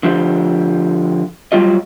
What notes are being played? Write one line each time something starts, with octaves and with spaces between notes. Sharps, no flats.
D3 F3 G4
F#3 G3 F4 G4 D#5